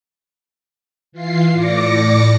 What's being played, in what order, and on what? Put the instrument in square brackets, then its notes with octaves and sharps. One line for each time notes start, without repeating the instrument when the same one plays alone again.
[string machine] E3 F4 C7
A2 D5 D6 A#6 C#7